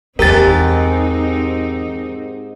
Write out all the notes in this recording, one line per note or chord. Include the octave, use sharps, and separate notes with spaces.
E2 G#2 E3 C4 D#4 G4 A#4 A6